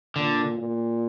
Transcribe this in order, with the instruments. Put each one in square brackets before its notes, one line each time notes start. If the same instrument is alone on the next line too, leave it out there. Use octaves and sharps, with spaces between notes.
[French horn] A#2 [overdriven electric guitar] D3
[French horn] A#2